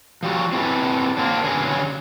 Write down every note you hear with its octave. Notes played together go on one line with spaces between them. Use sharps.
F3 G3 F#4
C4 D4 E4 G#4 A#4 B4
A#3 C4 D4
D3 F#3 B3 C#4 G#4